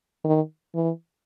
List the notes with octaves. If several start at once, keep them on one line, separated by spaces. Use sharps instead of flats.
D#3
E3